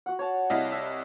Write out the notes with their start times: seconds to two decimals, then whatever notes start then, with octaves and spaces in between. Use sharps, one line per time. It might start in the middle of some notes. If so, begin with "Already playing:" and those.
0.06 F#4 F#5
0.19 C#5 A5
0.50 C2 E4 D#5 F5
0.72 E5